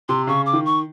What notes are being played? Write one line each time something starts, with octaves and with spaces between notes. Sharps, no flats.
C3 C6
C#3 C#6
D6
D#3
C#6